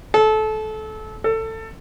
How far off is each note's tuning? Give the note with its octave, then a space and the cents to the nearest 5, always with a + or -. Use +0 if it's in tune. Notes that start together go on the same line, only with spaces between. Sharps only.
A4 -25
A4 +20